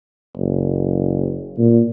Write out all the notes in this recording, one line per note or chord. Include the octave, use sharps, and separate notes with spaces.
F#1
A#2